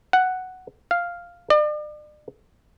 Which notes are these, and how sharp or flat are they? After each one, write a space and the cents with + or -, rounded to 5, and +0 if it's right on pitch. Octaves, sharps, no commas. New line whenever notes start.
F#5 +5
F5 +0
D5 +40